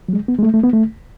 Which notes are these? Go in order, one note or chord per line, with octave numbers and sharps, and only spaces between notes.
F#3
G#3
B3
G#3
A3
A3
B3
A3